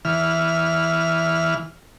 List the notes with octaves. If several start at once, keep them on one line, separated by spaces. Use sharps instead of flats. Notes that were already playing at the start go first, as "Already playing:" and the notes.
E3 F6